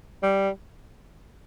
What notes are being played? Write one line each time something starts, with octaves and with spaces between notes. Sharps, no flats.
G3